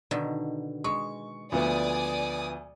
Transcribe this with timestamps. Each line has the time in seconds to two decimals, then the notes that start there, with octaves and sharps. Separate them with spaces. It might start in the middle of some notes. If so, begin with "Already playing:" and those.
0.11 B2 D3 D#3
0.84 G#3 C#6
1.52 D2 F3 B3 D5 G#5 D#6